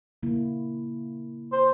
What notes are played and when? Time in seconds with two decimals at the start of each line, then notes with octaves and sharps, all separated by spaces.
0.23 C#3 A#3 E4
1.52 C5